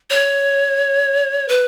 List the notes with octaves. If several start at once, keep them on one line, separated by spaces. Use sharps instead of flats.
C#5
B4